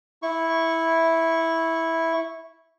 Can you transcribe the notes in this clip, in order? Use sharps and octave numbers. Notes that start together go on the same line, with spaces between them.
E4 C#6